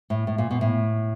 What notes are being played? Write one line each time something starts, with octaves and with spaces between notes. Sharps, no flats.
A2
A2
A#2
B2
A2